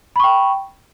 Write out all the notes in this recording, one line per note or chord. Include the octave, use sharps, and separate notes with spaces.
G5 B5 C#6